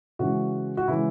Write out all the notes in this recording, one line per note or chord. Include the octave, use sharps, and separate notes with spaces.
C#3 E3 G#3 F#4
F#4
C#3 E3 G#3 E4